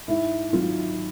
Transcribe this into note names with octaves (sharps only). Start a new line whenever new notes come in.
G#2 E4
D#3 F#3 F4